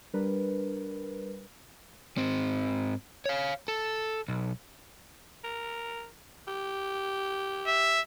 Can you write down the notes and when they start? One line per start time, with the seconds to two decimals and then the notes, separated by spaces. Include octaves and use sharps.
0.14 G3 D4 A#4 B4
2.17 G#2 C4
3.26 C#5 F5
3.68 A4
4.28 B1
5.44 A#4
6.47 G4
7.66 E5